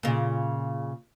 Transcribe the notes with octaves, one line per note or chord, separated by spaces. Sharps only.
A#2 C#3